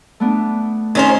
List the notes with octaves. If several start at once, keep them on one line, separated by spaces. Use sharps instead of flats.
A3 B3 D4
D#3 C#4 C5